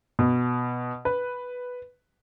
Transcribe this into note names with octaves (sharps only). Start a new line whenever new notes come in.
B2
B4